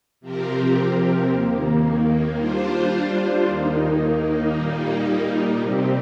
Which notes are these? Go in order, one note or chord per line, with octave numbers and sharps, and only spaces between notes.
C3 F3 C4 G4 A#4
D#2 D#3 A#3
G3 D4 F4 C5
D#2 D#3 A#3 D#4
A#2 G3 A#3 D#4
C3 G3 C4 G4